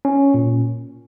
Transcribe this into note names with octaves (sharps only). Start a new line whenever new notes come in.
C#4
A#2